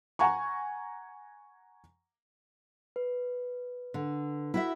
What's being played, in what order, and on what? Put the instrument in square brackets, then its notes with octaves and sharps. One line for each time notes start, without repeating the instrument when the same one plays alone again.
[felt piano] F#5 G#5 A#5 C#6
[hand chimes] B4
[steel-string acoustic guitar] D3
E4 F#4 E5